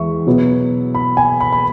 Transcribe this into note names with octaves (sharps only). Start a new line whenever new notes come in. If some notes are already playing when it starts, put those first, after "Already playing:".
Already playing: E2 E3 G#3 E5 C#6
B2 F#3 B3
B5
G#5
B5
B5